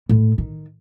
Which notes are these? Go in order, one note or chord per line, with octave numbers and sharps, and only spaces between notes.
A2
D#3